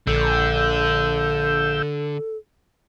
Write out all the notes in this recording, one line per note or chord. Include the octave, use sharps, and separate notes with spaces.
A#1 D3 A4 E6 G6